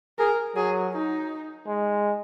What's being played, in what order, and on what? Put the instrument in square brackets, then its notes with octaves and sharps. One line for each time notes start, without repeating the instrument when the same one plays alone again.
[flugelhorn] G#4 [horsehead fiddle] A#4
[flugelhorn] F#3 [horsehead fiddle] G#4
[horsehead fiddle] D#4
[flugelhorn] G#3